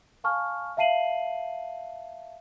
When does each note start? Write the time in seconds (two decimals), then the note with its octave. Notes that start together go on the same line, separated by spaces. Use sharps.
0.24 F5 G#5 A5 C#6 F6
0.77 E5 F5 A5 C7 D#7 F#7